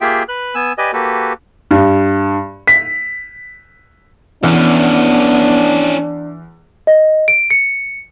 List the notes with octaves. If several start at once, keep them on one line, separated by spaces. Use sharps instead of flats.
A#3 F4 G4 G#4 E5 G5
B4 F#6
B3 G#5 E6
G4 B4 D5 D#5 G#5
A#3 F#4 G4 A4 B4
G2
B6
E2 B3 C#4 D4 E4
D#5
D7
C#7